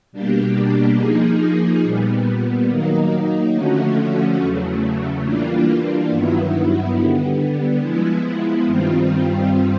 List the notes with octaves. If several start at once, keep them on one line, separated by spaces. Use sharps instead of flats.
B2 G3 A#3 D4 G4
F3 A#3 D#4 G#4
A#2 G3 B3
D#3 F#3 A#3 D#4
D3 F3 A3 C#4 F#4
E2 C#3 F#3 A3
E3 G3 A#3 D4 F4
G2 D#3 F#3 B3 E4
D3 G3 B3
F3 G#3 B3 E4
G2 D#3 G3 C4 F4